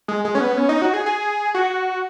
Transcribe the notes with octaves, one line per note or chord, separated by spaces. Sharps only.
G#3
G#3
C#4
B3
C#4
D#4
F#4
G#4
G#4
F#4